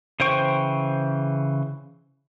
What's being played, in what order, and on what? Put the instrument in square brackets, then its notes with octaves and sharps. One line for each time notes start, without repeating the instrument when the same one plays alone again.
[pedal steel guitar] C#3 E3 C5 G5 C#6